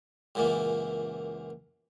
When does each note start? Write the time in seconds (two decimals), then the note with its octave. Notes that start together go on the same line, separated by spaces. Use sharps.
0.35 C#2 F#2 A#2 E3 A#3